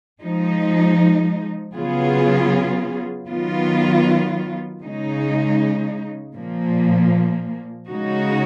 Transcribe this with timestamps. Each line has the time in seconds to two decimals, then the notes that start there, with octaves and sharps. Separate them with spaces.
0.22 F3 G#3 D#4
1.74 C#3 F#3 B3 F4 G#4
3.28 D#3 F#3 B3 F4
4.81 C#3 G#3 D#4
6.34 A#2 F3 A#3
7.87 C#3 G#3 D#4 F#4